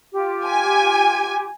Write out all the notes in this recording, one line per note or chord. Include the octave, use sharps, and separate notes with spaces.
F4 G4
G#5